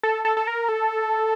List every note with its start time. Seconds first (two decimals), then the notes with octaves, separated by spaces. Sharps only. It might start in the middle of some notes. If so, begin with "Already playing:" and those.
0.03 A4
0.25 A4
0.37 A4
0.47 A#4
0.69 A4